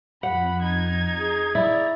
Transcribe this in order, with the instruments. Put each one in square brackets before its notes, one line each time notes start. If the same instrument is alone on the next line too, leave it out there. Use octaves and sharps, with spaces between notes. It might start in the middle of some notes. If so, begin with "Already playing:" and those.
[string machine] F2 [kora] F#5 [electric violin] B5
[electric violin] D#4 G#6
[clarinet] G#4
[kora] E4 [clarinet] D5 [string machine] A#5